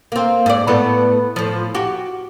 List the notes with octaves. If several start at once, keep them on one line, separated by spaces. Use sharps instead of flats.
A#3 C4
G#2 D5
A2 A3 B3
A2 F3
F#4 G4